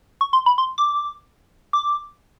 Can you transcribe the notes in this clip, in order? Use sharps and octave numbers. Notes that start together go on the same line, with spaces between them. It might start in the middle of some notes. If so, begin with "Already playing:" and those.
C#6
C6
B5
C6
D6
D6